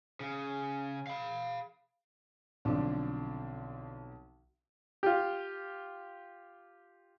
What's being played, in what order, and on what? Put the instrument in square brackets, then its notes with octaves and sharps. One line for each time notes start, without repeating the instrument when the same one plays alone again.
[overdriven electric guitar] C#3
F5 B5
[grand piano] B1 F3 C4 [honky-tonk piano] D3 D4
[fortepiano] F4 G4